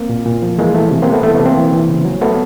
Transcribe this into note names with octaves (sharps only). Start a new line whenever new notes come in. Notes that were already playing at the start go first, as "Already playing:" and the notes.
Already playing: A#3 C4
A#2
A#2
F3
E3 G#3 A#3
E3 A3
C3
C3 A#3 C4
A3 B3
E3 A3
C3 A3 B3
A#3 C4
E3
E3
C#3
F#3
F#3 A3 B3